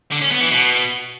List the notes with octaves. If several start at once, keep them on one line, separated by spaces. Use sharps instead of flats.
D3
C#4
B3
E3
B2